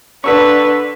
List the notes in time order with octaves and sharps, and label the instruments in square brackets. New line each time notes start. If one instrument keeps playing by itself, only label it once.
[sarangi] D3 [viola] B4 [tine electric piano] C#6 E6 B6